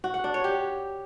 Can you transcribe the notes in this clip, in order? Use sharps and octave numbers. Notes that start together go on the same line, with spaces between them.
F#4
F#5
D4
C#5
G4